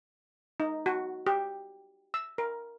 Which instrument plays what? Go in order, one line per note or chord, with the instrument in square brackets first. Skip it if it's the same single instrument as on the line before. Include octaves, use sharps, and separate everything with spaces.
[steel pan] D#4
F#4
G4
E6
A#4